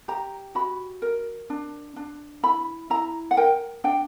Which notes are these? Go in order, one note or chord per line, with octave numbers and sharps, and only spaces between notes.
G4 A#5
F#4 B5
A#4
D4
D4
E4 B5
E4 A#5
F#5
A#4 G5
D4 G5